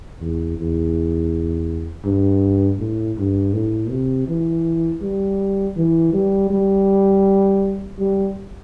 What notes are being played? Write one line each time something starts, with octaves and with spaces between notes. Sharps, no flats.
E2
E2
G2
A2
G2
A2
C3
E3
G3
E3
G3
G3
G3